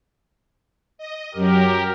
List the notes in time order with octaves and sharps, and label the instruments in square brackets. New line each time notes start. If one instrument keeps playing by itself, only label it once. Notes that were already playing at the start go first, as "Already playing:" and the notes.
[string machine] D#5
[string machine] F#2 F#3 [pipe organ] G4 A#4